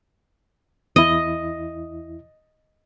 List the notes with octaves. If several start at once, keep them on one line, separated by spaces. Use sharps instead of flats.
E2 E4 D#5